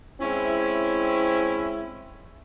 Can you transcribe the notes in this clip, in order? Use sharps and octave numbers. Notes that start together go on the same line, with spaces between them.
G#3 C4 C#4 E4